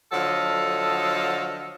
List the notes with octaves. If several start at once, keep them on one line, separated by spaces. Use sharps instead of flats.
D3 F3 F#3 A4 D#5 F5